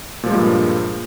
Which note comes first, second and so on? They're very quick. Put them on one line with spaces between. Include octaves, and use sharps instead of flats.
A#2 F3 G#3 A#3 G2